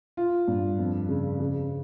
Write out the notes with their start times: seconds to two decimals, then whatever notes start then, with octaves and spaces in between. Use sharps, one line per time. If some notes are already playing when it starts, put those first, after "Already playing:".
0.17 F4
0.48 G2
0.79 F2
1.09 C#3
1.39 C#3